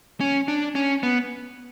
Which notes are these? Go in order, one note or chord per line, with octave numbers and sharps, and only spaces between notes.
C#4
D4
C#4
B3